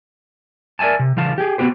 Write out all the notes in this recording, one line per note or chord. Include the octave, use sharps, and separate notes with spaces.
A#4 D5 E5 G#5 A5
C3
C#3 E3 F5 A5
G4 G#4
B3 C4 F#4 G4 C5